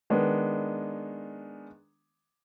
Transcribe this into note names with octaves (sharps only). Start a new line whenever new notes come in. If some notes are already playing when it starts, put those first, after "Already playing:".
D#3 G#3 B3 D4